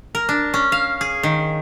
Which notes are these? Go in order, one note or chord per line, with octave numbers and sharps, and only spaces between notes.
A#4
D4
C#4
F5
G#4
D#3